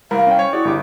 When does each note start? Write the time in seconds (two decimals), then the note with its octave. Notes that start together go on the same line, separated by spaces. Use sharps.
0.11 C2 A#4 F5 B5
0.27 C#4 G5
0.39 C#5
0.53 E4 F#4 G#4 D5
0.65 G1 G4 D6